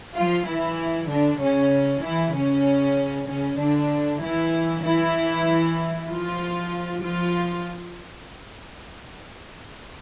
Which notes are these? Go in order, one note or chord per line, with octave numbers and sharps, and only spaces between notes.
F3 F4
E3 E4
D3 D4
C#3 C#4
E3 E4
C#3 C#4
C#3 C#4
D3 D4
E3 E4
E3 E4
F3 F4
F3 F4